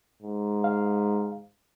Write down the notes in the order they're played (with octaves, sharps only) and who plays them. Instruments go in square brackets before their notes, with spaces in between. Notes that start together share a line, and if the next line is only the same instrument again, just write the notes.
[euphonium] G#2
[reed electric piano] F5